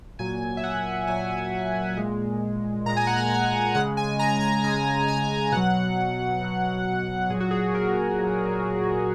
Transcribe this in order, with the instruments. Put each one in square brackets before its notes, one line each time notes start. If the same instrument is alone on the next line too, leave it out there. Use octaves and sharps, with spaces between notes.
[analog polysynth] A#2 F#3 G#5
E5
F#5
A#2 F#3 G#5
A#2 G#3
A#2 G#3 A#5
G#5
F#5
G#5
G#5
C#3 G#3 F#5
G#5
A#5
A#5
C#3 G#3 G#5
G#5
B2 F#3 F#5
B2 F#3
A#2 F#3 G#4
F#4
G#4
A#4
A#2 F#3